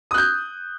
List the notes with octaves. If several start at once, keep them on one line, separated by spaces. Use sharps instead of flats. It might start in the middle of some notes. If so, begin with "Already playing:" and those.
D#6 F#6 G6